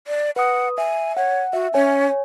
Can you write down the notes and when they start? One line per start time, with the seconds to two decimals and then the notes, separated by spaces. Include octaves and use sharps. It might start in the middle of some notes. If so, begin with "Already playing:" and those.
0.07 D5
0.36 B4 F#5 D#6
0.78 E5 G#5
1.17 C#5 F#5
1.53 F#4 E5
1.74 C#4 C#5 G#5